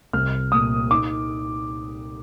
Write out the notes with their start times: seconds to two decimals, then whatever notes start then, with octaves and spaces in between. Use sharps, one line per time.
0.13 C2 F6
0.52 A#2 D#6
0.91 D#4 D6